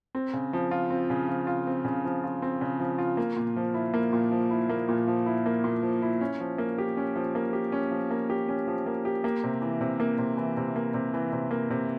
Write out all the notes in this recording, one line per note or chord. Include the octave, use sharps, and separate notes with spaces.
C4
C#3
F3
F4
C4
C#3
F3
F4
C4
C#3
F3
F4
C4
C#3
F3
F4
A#3
A#2
F3
E4
A#3
A#2
F3
E4
A#3
A#2
F3
E4
A#3
A#2
F3
E4
C#4
F3
A#3
G4
C#4
F3
A#3
G4
C#4
F3
A#3
G4
C#4
F3
A#3
G4
A#3
C3
E3
C3
A#3
C3
E3
C3
A#3
C3
E3
C3
A#3
C3